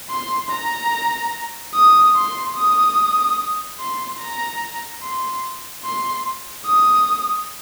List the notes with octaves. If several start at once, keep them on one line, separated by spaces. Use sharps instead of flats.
C6
A#5
D#6
C6
D#6
C6
A#5
C6
C6
D#6